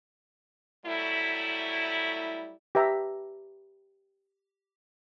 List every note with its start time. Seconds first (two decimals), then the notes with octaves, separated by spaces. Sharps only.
0.85 F#3 G3 A3 E4
2.75 G4 B4 E5 A#5